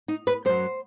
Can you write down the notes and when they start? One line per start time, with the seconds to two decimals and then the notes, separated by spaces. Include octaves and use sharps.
0.08 D#4
0.27 B4
0.45 F#2 F#3 C5